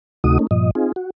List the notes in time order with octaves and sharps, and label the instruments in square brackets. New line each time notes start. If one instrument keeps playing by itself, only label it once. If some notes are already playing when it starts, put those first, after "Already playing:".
[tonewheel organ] D2 C3 A3 D#4 F#4 D#6
A3 A#3 C#4 D#4
G2 A#2 F3 D#5
C4 D#4 F4 G#4
F#4